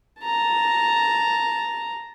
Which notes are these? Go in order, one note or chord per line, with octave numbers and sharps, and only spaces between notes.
A5 A#5